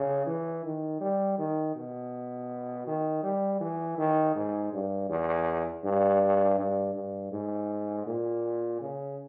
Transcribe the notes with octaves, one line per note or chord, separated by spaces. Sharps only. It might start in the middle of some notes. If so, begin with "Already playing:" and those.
Already playing: C#3
E3
D#3
G3
D#3
B2
D#3
G3
E3
D#3
G#2
G2
E2
G2
G2
G2
G#2
A#2
C#3